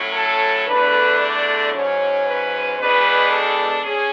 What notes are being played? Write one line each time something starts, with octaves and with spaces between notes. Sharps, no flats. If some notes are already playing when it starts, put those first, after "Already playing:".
Already playing: A2 F#3 A3 C#4
A4
E2 D3 A3 D4 B4
D5
G#2 F#3 C#4 C#5
B4
E2 B2 G#3 D4 B4
A4
C#4 G#4